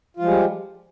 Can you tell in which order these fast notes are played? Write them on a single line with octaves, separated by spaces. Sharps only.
F4 F3 G#3 G3